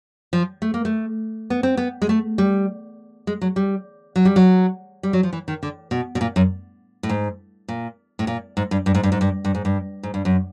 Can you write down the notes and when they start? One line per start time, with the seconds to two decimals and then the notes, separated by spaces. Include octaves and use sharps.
0.33 F3
0.62 A3
0.74 A#3
0.85 A3
1.50 B3
1.63 C4
1.77 B3
2.02 G#3
2.09 A3
2.38 G3
3.27 G#3
3.41 F#3
3.56 G3
4.16 F#3
4.25 G3
4.36 F#3
5.03 G3
5.13 F#3
5.23 F3
5.33 E3
5.48 D#3
5.63 D3
5.91 B2
6.15 B2
6.21 A#2
6.36 F#2
7.03 A2
7.09 G#2
7.68 A#2
8.19 A2
8.27 A#2
8.57 G#2
8.71 G2
8.86 G2
8.95 G#2
9.03 G2
9.12 G#2
9.21 G2
9.45 G2
9.55 G#2
9.65 G2
10.03 G#2
10.14 G2
10.25 F#2